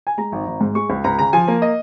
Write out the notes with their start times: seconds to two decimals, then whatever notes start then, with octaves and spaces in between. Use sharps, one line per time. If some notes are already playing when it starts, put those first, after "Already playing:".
0.07 G#5
0.18 G#3 A#5
0.32 G#1
0.47 G#1
0.61 G#2
0.75 G#3 C#6
0.90 C#2
1.04 C#2 A#5
1.19 C#3 A#5
1.33 F3 G#5
1.48 A#3
1.62 D#5